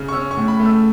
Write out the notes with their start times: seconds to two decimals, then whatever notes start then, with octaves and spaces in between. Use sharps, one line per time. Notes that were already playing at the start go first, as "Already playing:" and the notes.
Already playing: C#3
0.08 C#6
0.13 C#4 E6
0.31 C#6
0.37 A2
0.48 B5
0.60 A3
0.66 E6